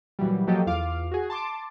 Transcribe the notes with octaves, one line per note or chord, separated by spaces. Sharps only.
A#2 E3 F#3 G3
F3 F#3 A#3 G4 A4 D#5
E2 F4 F5 D6
F#4 G#4
A5 C6 D6